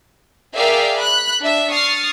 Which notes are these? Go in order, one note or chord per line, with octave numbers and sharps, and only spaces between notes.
G#4 A#4 D5 E5 F5 G5
B5 F#6
D4 E5
C#6 D#6 F6 A6 C7